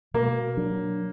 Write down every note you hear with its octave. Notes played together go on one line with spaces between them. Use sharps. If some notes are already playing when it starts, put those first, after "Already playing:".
B2 A#3
F#3 D4